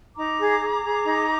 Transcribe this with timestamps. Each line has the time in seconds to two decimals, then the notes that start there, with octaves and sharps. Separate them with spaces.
0.17 D#4 A#5 D6
0.39 G#4
0.61 G#4
0.83 G#4
1.05 D#4